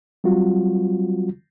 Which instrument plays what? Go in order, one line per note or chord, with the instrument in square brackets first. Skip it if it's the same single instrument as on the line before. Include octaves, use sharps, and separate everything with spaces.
[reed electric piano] F#3 G3 C4 F4 F#4